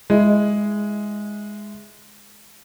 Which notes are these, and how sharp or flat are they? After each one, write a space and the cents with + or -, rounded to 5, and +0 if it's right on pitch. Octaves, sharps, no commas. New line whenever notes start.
G#3 +0 E4 +0